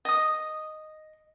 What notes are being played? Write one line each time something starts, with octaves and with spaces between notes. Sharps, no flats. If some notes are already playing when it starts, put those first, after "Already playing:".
D#5 D#6